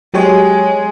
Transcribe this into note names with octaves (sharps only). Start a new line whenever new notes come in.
F#3 G#3 G4 C#5